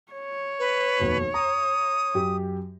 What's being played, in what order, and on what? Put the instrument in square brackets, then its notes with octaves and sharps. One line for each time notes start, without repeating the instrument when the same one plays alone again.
[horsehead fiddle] C#5
[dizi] B4
[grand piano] F1 D#2 B2
[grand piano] A#5 [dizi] D#6
[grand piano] F#2 G4